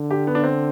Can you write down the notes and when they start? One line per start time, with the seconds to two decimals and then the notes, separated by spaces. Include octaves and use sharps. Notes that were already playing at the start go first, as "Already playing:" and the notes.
Already playing: D3
0.11 G4
0.27 B3
0.35 D4
0.44 C4